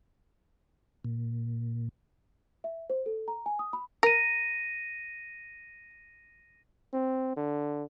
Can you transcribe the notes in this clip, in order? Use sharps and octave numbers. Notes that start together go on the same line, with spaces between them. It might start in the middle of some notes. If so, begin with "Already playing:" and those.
A#2
E5
C5
A4
A#5
G#5
D#6
B5
A#4 A#6 D#7
C4
D3